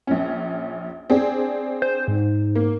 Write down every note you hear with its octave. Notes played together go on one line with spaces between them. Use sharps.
A#1 C#4
C4 D4 G#4
C5
G#2
A#3